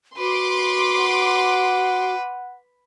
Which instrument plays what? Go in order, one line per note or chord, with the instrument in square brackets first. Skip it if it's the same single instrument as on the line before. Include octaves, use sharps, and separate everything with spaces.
[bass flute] F#4 [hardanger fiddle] B4 [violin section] C6 D6
[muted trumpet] F#5